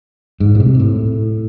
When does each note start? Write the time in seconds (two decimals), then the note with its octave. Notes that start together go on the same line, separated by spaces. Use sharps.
0.40 G#2
0.55 A2
0.60 C3
0.80 A2